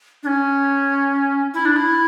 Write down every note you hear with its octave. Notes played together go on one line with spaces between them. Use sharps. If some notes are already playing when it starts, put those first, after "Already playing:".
D4
C#4
E4
D4
E4